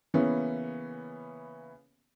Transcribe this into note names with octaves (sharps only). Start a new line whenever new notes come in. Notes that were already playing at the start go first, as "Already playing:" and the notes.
C#3 E3 A#3 B3 C#4